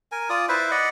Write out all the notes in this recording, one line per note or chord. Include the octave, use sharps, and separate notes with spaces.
A#4 G#5
F4 D5 D#6
E4 B4 C5 E5
D5 D#5 F#5 B5